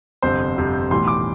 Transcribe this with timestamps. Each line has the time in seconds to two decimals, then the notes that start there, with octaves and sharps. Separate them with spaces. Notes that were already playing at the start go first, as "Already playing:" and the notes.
0.22 G1 F2 C3 C5
0.56 G1 F2 C3
0.91 B1 A2 E3 G3 C6
1.08 D6